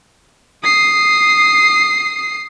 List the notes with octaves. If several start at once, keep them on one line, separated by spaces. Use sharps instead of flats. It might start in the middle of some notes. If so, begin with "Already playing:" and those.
D#6 C7